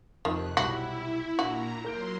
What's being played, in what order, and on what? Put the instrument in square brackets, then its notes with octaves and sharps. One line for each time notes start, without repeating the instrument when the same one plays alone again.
[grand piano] F2 [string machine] C3 F#6 [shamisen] D#3
[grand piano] B1 G3 [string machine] E4 [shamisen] F#4
[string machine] A#2 A#5 [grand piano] D4 [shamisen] F#4
[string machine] F#3 C6 [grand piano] A#4 G6 D7